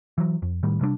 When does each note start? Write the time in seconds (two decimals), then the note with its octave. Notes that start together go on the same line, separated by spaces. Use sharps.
0.18 E3 F#3
0.42 F2
0.63 A2 D#3 G3
0.81 C3 G3 A#3 D4